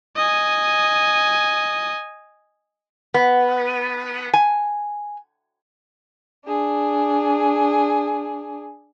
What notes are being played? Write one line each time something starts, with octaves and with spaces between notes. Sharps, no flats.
D#5 G#5
B3
G#5
D4 G#4